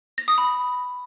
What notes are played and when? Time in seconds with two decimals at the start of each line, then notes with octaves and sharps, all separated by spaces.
0.18 A#6
0.28 D#6
0.38 B5